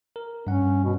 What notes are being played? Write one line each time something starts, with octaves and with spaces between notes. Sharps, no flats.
A#4
G2 C#4 F#5
B2